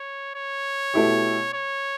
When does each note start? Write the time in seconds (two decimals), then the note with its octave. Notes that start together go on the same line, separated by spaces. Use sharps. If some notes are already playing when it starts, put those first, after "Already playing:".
Already playing: C#5
0.35 C#5
0.94 B2 A3 E4 G4
1.53 C#5